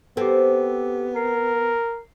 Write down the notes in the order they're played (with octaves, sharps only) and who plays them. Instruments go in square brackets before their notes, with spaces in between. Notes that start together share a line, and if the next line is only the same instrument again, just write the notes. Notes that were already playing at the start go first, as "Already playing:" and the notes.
[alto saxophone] B3 [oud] C4 [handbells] G4 A4
[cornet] A#4 [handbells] C7